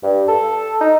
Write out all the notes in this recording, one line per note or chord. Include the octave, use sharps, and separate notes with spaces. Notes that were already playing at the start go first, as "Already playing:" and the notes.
G2
A4
D#4